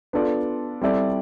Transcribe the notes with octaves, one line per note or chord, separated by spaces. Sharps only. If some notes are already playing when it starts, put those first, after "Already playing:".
B3 D4 F4 A4 D5
G3 C4 E4 A4 D5